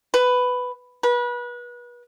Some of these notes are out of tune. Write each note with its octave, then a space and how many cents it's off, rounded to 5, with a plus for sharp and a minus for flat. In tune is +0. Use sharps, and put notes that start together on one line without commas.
B4 +10
B4 -30